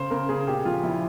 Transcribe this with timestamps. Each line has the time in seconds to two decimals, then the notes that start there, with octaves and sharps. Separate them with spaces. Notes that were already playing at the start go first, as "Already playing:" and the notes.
Already playing: C#3 C5
0.10 C#3 A#4
0.29 C#3 G#4
0.47 A#2 G4
0.65 F3 F4
0.83 F3 E4